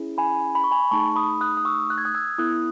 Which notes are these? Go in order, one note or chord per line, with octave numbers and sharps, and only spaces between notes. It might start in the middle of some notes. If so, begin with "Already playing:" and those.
Already playing: C#4 E4 G#4
G#5 B5
B5
C#6
G#5 B5
A3 D#4 G#4 A5 C#6
B5 D#6
D#6 F#6
D#6
C#6 E6
F#6
G#6
D#6 F#6
E6 G#6
B3 E4 A4 D#6 F#6